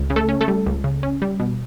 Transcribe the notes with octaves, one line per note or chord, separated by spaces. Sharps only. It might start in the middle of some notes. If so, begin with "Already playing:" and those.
Already playing: C#2
C#3
A3 A4
C#4
A3 A4
G3
C#2
C#3
C#4
G3
B2